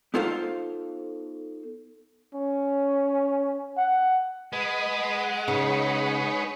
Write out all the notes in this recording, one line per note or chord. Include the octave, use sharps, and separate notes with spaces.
B3 D#4 F4 A4 C5 F5
C#4
F#5
G#3 B4 D#5 F#5
C#3 D#4 B4 C#5